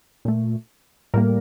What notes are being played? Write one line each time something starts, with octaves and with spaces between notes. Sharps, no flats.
A#2 A3
A2 G3 A#3 A#4